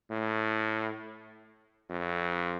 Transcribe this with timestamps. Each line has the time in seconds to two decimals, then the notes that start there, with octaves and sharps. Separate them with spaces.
0.10 A2
1.90 F2